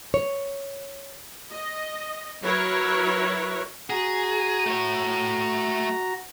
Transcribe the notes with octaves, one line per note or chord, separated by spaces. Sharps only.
C#5
D#5
F#3 E4 A#4 B4 C#5
F#4 G#4 A#5
A3 C#5